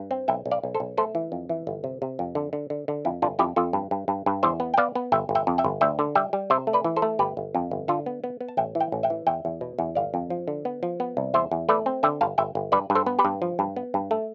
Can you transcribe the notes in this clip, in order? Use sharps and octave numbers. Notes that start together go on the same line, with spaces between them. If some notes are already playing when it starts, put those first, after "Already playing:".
Already playing: G2
C4
B1 E5 G5
B1
D5 F5
B1
A4 C5
B1
A3 A4 C5
E3
F2
E3
G1
C3
C3
F2
D3
D3
D3
D3
F2 E4
G1 D4 F4
F2 E4 G4
F2 F4 A4
G2
G2
G2
G2
E2 C5 E5
B3
G5
B3 D5 F5
B3
G1 E5 G5
G1
E5 G5
F2
E5 G5
G1
D2 E5 G5
D3
G3 E5 G5
G3
C3 C5 E5
A3
B4 D5
E3
A4 C5
A3
G1 G4 B4
G1
F2
G1
D3 F4 A4
B3
B3
B3
A5
A1 E5 G5
E3
E5 G5
A1
E5 G5
E3
E2 E5 G5
E2
B2
E2
G1 D5 F5
F2
F3
D3
B3
F3
B3
C2
E2 C5 E5
E2
A3 B4 D5
C4
D3 E5 G5
G1 F5 A5
G1 E5 G5
G1
G2 B4 D5
G2
A4 C5
B3
G4 B4
G2
F3
G2
B3
G2
A3